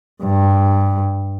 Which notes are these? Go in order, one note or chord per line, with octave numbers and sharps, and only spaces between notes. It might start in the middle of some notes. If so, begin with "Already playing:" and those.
G2